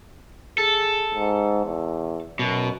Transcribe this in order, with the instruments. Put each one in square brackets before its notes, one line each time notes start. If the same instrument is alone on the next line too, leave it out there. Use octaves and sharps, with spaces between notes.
[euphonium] G#4 [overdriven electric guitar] A4
[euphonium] G#2
E2
[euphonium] F#2 [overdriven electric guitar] B2